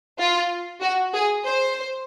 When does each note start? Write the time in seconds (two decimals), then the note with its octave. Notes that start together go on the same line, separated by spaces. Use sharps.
0.19 F4
0.81 F#4
1.14 G#4
1.45 C5